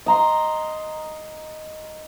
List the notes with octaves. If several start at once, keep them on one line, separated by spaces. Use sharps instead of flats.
D#5 A#5 C6